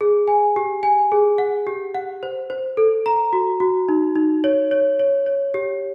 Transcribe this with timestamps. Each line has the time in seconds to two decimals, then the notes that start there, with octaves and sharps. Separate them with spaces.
0.01 G#4
0.28 G#5
0.56 G4
0.83 G#5
1.12 G#4
1.38 F#5
1.67 G4
1.95 F#5
2.23 C5
2.50 C5
2.77 A4
3.06 A#5
3.33 F#4
3.60 F#4
3.89 D#4
4.15 D#4
4.44 C#5
4.71 C#5
4.99 C#5
5.26 C#5
5.54 G4